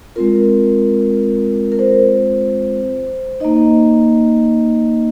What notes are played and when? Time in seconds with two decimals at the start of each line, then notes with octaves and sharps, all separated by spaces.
0.16 G#3 C4 F4 A#4
1.72 A#4
1.79 C5
3.40 A#3 D#4 D#5